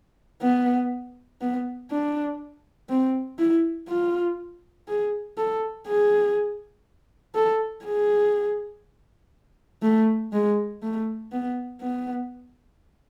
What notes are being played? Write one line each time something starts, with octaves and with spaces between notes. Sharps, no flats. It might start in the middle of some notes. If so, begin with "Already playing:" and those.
B3
B3
D4
C4
E4
F4
G#4
A4
G#4
A4
G#4
A3
G#3
A3
B3
B3